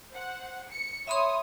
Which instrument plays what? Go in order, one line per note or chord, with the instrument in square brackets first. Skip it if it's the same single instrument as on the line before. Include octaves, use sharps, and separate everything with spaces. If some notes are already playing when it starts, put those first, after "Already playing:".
[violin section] C5 F#5
C#7
[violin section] C#5 D#6 [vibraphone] E5 B5 C6